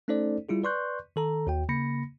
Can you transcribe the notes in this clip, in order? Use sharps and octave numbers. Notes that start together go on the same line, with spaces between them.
A3 C#4 D#4 A4 C5 D5
G3 E4 F4 G#4
B4 D5 C6 C#6 F#6 G6
D#3 A4 A#5
D#2 F#4 G5
C#3 A#3 B5 A#6 C#7